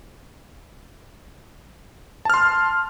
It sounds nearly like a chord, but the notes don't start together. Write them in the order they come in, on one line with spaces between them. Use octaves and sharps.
A5 F6 C6